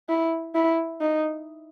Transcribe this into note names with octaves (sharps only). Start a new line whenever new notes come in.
E4
E4
D#4